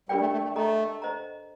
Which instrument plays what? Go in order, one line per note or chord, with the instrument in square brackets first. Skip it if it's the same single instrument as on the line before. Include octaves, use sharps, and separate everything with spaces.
[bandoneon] G3 [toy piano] D4 G4 A#4 D5 G5
[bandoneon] A3
A3
A3
[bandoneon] A3 [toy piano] A4 D#5 A#5
[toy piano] C5 D#5 A#5